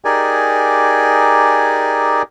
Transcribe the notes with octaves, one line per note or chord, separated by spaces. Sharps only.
D#4 G4 G#4 A#4 D5 G#5